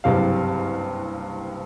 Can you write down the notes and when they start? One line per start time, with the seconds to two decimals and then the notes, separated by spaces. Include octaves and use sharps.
0.04 F#1 C2 G2 C3 G3 F5